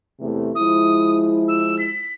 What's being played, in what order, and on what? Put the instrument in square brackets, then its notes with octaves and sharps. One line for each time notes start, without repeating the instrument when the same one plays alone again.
[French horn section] E2 C3 A3
[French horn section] F3 G#3 E4 [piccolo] D#6
[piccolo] E6
B6